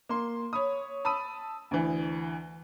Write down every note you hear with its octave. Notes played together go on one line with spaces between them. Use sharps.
A#3 C6
C#5 B5 D#6
A5 B5 D#6 E6 D#7
D2 E3